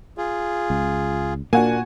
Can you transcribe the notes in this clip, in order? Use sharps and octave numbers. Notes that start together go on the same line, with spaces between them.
F4 G#4
C#2
A#2 A#3 D4 F#4 G#5